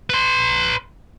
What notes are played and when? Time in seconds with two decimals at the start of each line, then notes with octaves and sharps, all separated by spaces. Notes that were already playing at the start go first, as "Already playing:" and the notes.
0.10 B4 C6